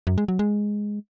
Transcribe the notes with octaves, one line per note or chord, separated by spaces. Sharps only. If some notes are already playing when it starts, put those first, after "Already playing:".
F#2
G#3
F#3
G#3